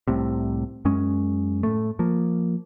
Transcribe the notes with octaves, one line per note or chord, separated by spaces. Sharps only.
C2 A2 C3
F#2 G#3 C#4
A2 A3
F3 A#3